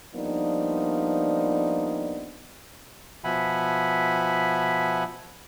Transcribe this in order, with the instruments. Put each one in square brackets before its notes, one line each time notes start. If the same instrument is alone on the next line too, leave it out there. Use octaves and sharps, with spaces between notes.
[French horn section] F3 G3 A#3 B3 D4 D#4
[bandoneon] B2 F3 E5 F#5 G#5 B5